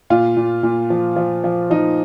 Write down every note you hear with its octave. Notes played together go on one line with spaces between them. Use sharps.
A#2 F4
A#2
A#2
F3
F3
F3
F3 D#4